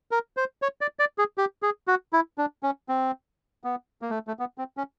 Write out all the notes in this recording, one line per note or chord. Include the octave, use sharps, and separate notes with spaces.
A#4
C5
C#5
D5
D5
G#4
G4
G#4
F#4
E4
D4
C#4
C4
B3
A#3
A3
A3
B3
C4
C#4